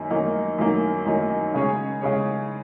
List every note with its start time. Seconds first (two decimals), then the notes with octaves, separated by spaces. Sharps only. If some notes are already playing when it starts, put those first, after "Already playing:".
Already playing: F#2 D#3 F#3 A#3 D#4
0.10 F#2 D#3 F#3 A#3 D#4
0.58 F#2 D#3 F#3 A#3 D#4
1.05 F#2 D#3 F#3 A#3 D#4
1.54 C#3 G#3 C#4 G#4 C#5
2.01 C#3 G#3 C#4 G#4 C#5